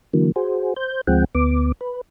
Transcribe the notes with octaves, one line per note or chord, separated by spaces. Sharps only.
D3 E3 F#3 A#3
F#4 G#4 C5
C5 G6
D2 F3 G#3 C4 F#5 G5
D2 B3 D6
B4